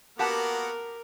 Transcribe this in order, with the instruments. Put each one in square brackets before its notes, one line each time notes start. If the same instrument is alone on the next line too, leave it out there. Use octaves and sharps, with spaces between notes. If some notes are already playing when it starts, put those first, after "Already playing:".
[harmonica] A#3 B3 F#4 [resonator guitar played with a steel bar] G4 F#5 A5 [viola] A#4